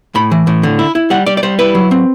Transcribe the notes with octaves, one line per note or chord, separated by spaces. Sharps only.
A2 B5
E3
A2
D3
E4
E4
G3 F#5
G3 D5
D5
G3 C5
E4 B4
F#3
C4